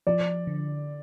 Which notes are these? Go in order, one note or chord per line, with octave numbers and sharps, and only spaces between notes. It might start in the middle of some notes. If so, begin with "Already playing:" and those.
F3 D5
D3